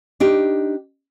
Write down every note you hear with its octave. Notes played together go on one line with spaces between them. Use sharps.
D4 D#4 G4